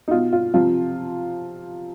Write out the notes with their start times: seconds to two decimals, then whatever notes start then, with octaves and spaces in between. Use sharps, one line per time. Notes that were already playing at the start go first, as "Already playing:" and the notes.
0.08 D#4
0.11 B2 F4
0.33 F4
0.54 C3 F3 F4